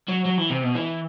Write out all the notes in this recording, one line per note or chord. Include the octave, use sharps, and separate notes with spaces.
F#3
F#3
E3
C3
B2
E3